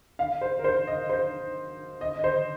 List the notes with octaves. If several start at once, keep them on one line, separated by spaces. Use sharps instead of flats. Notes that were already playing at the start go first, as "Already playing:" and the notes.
F5
C5
A#4
C5
D#5
C5
D#5
D#5
C5